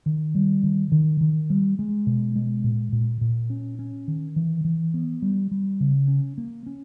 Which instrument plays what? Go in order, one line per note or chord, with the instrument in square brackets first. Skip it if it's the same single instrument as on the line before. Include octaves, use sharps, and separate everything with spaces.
[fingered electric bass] D#3
G3
D#3
D#3
D#3
G3
G#3
B2
G#3
A#2
A#2
A#2
C#4
C#4
D#3
E3
E3
B3
G3
G3
C#3
C#4
A#3
C#4